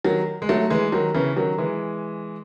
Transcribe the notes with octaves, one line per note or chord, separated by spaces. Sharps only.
D#3 F#3
G#3
F#3 A3
E3 G#3
D#3 F#3
C#3 E3
D#3 F#3
E3 G#3